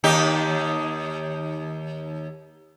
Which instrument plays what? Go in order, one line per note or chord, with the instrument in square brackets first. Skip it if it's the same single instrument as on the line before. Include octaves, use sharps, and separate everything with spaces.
[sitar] D#2 D#4 G4